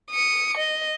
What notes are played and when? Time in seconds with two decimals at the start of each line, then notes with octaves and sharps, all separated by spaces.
0.11 D#6 C#7
0.57 D#5